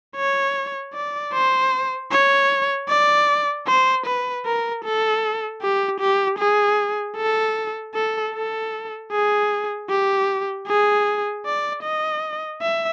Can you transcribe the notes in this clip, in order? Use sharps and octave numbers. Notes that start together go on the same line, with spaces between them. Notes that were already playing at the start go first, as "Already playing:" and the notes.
C#5
D5
C5
C#5
D5
C5
B4
A#4
A4
G4
G4
G#4
A4
A4
A4
G#4
G4
G#4
D5
D#5
E5